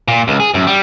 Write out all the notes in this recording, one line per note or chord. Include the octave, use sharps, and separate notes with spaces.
A#2
C#2
G#4
F#2
G3